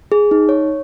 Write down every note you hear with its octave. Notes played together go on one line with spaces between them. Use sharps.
G#4
D#4
C#5